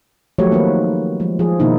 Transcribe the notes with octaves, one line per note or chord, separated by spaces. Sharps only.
F3 F#3 A3 F#4 G4 C#5
D#3 A#3 C4 D#4 F#4 B4
F3 G#3
F3 G#4
B2 D#3 A#3 D#4 E4